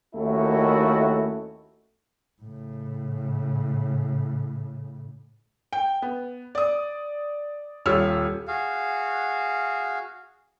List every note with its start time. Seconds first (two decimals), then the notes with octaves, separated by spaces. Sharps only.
0.15 D#2 D#3 A3 C#4 E4 F#4
2.42 A2 C#3
5.73 G5
6.02 B3
6.55 D5 D#6
7.86 D#1 G3 F4 C#5 E6 F6
8.48 F#4 G#4 F5